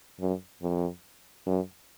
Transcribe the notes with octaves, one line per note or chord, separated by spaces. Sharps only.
F#2
F2
F#2